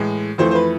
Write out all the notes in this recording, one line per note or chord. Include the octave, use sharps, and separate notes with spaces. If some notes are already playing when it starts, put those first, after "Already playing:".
Already playing: A2 E3 G#3
F2 E3 A3 C5
C5
B4